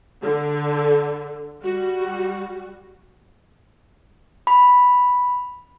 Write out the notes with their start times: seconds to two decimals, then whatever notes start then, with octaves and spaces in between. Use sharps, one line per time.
0.22 D3
1.63 G3 F#4
4.47 B5